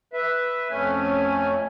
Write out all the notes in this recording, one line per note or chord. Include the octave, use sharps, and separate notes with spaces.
B4 E5
F2 A3 C#4 G#5